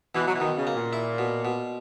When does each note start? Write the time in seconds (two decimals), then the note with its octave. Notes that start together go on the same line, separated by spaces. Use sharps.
0.15 B2 E3
0.28 F#3
0.34 E3
0.40 B2 D#3
0.58 C#3
0.67 A#3
0.75 A#2
0.93 E4
1.18 B2
1.45 B2